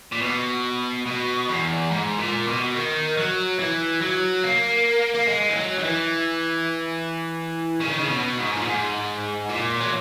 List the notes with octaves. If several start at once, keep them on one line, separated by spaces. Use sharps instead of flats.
A#2
B2
B2
E2
G#2
A#2
B2
D#3
F#3
E3
F#3
A#3
A#3
G#3
E3
F#3
D#3
E3
C#3
D#3
C#3
B2
G#2
A#2
G#2
A#2
F#3